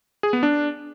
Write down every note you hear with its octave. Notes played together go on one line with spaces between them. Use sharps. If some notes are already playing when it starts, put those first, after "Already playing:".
G#4
B3
D4